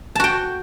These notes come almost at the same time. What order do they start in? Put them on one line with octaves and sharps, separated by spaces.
A5 F#4 G5